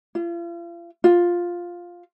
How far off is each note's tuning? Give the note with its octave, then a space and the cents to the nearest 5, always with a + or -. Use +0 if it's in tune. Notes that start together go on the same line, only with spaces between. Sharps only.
F4 -40
F4 +5